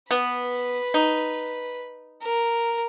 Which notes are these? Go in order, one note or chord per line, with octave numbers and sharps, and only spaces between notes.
B3 B4
D#4
A#4